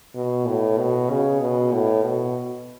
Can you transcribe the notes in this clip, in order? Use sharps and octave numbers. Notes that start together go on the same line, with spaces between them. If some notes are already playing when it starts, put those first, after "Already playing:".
B2
A2
B2
C#3
B2
A2
B2